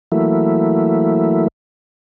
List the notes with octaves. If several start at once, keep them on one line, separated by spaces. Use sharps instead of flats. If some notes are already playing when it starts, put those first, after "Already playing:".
E3 F#3 A3 A#3 E4